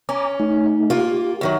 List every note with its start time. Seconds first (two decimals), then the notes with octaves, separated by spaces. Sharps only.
0.09 C#4 G#5 A#5 D6
0.40 A3 D#4
0.90 A#3 F4 G4
1.41 F#2 D#3 F#3